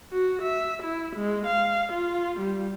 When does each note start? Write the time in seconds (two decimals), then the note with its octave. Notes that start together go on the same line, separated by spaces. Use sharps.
0.12 F#4
0.42 E5
0.83 E4
1.16 G#3
1.47 F5
1.93 F4
2.40 G3